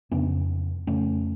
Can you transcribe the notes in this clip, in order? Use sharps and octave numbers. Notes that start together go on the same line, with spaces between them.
F2 C#3 B3 D4
F2 C#3 A3 C#4